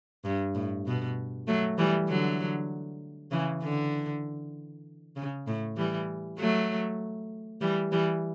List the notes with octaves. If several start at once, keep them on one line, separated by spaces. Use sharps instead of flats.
G2
A2
B2
F#3 A3
E3 G3
D3 F#3
C#3 E3
D3
C#3
A2
E3 G3
F#3 A3
E3 G3
E3 G3